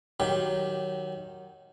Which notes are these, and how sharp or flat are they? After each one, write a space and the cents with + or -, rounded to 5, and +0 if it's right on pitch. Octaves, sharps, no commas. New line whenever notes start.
D#3 -5 F#3 +5 G4 -5